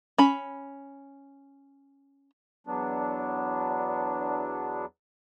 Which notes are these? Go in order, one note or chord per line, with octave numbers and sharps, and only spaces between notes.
C#4 B5
E2 F#3 B3 D4